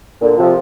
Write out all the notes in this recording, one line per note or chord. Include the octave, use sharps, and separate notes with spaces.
A#2 D3
C3 F3